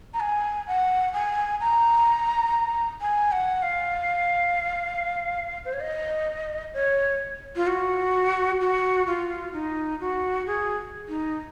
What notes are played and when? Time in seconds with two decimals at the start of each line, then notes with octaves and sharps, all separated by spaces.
0.14 A#5
0.20 G#5
0.67 F#5
1.14 G#5
1.61 A#5
3.01 G#5
3.32 F#5
3.62 F5
5.65 C5
5.73 C#5
5.80 D#5
6.74 C#5
7.56 F4
7.67 F#4
8.61 F#4
9.07 F4
9.53 D#4
10.00 F#4
10.47 G#4
11.09 D#4